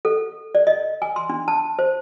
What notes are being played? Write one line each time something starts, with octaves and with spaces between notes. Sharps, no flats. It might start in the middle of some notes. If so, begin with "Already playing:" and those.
A4
D5
D#5
G#5
C6
D4
A5
C5